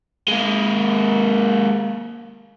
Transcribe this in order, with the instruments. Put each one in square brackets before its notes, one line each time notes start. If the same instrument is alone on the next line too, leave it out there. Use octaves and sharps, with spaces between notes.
[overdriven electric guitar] G#3 A#3